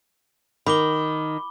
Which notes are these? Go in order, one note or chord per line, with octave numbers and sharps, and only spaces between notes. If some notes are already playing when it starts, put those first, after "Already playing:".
D#3 B5 D6 G7